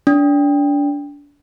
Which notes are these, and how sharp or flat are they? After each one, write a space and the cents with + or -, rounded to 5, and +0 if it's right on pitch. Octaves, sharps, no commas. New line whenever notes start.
D4 -30